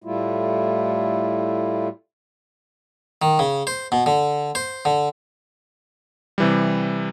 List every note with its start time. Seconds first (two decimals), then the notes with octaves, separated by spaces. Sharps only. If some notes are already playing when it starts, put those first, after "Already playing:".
0.04 A2 G3 A3 E4 F4
3.22 D#3
3.39 C#3
3.67 C5
3.92 B2
4.06 D3
4.55 C5
4.85 D3
6.38 C3 E3 G3